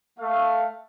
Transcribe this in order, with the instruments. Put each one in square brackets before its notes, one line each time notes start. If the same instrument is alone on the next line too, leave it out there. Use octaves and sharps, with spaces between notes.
[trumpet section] A3 [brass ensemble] F5